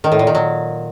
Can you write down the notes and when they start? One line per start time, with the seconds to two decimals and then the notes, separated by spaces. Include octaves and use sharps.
0.04 D#3
0.12 A2
0.19 A#2
0.27 D#3
0.35 F#3